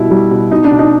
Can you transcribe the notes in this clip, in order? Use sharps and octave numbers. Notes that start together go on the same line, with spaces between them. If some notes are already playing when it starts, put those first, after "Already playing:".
Already playing: B2 G3 E4
G3
B2
B2 D#4
D4
B2
D#4